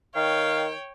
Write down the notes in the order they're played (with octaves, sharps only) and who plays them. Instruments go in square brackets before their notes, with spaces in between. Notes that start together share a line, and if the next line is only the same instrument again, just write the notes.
[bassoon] D#3 [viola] C#5 G5 [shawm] F5